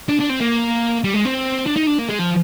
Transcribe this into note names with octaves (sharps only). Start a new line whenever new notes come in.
D4
D4
C4
A#3
G3
G#3
C4
D4
D#4
D4
A#3
G#3
F3